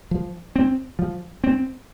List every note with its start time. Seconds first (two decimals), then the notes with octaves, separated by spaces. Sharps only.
0.11 F3
0.56 C4
0.99 F3
1.44 C4